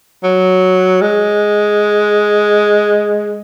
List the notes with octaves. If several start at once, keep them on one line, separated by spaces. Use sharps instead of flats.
F#3
G#3